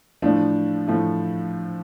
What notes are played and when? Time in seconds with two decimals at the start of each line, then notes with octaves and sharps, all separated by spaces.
0.22 A2 F3 A3 D4
0.87 A2 F3 A3